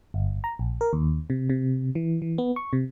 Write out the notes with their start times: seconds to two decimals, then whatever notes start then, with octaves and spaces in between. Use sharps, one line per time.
0.14 G1
0.44 A#5
0.59 A#1
0.81 A#4
0.93 D#2
1.30 C3
1.50 C3
1.95 E3
2.22 E3
2.38 B3
2.56 C#6
2.73 C3